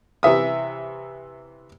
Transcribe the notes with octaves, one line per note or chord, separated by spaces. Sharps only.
C3 E3 E5 D#6